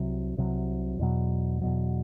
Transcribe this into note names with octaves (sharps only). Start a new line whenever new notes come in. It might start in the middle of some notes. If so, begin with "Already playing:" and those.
Already playing: C2 C3 F#3
C2 C3 F#3
E2 B2 F#3
E2 B2 F#3